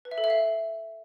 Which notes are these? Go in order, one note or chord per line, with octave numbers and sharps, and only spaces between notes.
B4
E5
A4
E5
F5